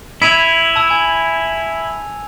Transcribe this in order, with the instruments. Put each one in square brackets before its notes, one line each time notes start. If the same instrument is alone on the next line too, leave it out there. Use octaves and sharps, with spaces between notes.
[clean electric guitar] E4 [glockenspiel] G#6 D#7 F7
[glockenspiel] A5 E6
G#5